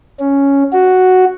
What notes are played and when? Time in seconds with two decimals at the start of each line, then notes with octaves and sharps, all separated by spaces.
0.20 C#4
0.73 F#4